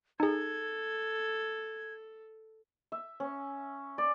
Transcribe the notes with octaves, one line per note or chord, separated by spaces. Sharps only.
D#4 G#4 A4 G#6
E5
C#4
D5